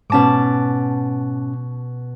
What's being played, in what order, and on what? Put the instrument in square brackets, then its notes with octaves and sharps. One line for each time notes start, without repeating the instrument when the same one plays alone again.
[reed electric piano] G#2 C#4 [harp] B2 A5 D6